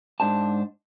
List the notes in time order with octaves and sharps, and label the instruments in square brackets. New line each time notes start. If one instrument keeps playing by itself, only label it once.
[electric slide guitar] G#2 D4 C5 A5